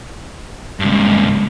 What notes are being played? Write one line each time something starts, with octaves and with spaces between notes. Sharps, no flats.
G2 C#3 G#3